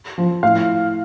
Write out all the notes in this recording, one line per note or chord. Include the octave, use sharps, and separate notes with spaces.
F3
A2 F5